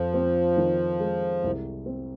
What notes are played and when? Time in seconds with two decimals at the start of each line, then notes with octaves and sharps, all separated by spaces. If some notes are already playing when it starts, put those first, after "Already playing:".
Already playing: F2 F3
0.14 C4
0.57 D#3
1.00 G#3
1.44 C2
1.86 C4